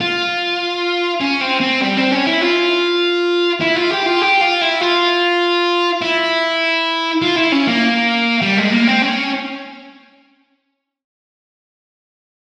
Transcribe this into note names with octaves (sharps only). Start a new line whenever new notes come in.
F4
C#4
C4
C4
G3
C4
C#4
E4
F4
E4
F4
G4
F4
G4
F4
E4
F4
E4
F4
E4
C#4
A#3
G3
G#3
A#3
C4
C#4